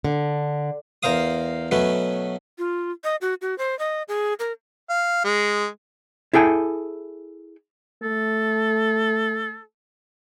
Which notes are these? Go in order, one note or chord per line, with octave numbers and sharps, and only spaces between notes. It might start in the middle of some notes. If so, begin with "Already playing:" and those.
D3
E2 A#4 C5 F5 D#6
B2 F#3 A3 C#4 B4
F4
D#5
F#4
F#4
C5
D#5
G#4
A#4
F5
G#3
E4 G#4 A4 G5 G#5
A3 A4